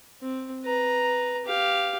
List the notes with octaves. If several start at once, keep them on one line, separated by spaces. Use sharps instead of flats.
C4
B4 A#5
G4 F5